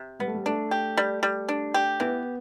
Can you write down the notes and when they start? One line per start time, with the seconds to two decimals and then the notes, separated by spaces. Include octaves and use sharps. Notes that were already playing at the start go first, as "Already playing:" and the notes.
Already playing: C3
0.19 G3 B3
0.27 A3
0.34 G3
0.46 A3 D4
0.71 G4
0.97 G3
1.23 G3
1.49 D4
1.74 G4
2.00 E3 B3